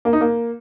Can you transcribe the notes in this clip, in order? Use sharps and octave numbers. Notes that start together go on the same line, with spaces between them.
A#3
D#4
A#3